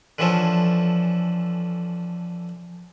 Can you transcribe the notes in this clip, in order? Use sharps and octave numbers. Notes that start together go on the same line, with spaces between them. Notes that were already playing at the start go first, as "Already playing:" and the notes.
D3 E3 F3 C#4 A4